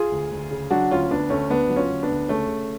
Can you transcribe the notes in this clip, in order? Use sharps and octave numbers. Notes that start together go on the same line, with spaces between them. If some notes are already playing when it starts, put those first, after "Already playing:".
Already playing: F4 G#4
D2
D2
C#3
F#3 D4 F#4
D2 C#4 F4
D2 B3 D4
D2 A3 C#4
D2 B3 D4
F#3
C#4 F4
D2
B3 D4
D2
C#3 A3 C#4
C#3